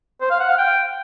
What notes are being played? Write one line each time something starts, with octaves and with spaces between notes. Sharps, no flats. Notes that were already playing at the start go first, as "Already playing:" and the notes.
C5
F5
F#5
F5
G5